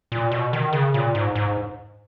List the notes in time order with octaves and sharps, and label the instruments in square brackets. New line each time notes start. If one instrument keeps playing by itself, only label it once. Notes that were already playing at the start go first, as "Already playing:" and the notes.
[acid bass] A#2
B2
D#3
C#3
A#2
G#2
G#2